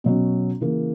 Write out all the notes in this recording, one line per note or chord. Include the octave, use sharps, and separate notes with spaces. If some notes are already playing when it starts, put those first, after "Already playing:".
B2 F#3 C#4
C#3 E3 A#3